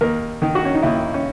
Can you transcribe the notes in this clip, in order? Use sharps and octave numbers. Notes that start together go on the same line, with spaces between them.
D#2 A#4
D#3
F#4
C#4
D#4
D#2 E4
C#4